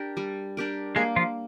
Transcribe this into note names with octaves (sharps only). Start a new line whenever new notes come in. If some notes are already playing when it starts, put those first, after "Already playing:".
Already playing: D4 G4 A#4
G3
D4 G4 A#4
G#3 A#3 G#4
F3 F4